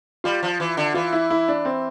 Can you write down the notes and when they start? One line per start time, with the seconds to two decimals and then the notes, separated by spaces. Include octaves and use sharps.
0.24 G3 F4
0.43 F3
0.60 E3
0.77 D3
0.94 E3 F4
1.13 E4
1.30 E4
1.48 D4
1.65 C4